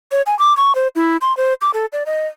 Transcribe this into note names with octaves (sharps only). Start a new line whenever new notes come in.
C#5
G#5
D6
C#6
C5
E4
C6
C5
D6
A4
D5
D#5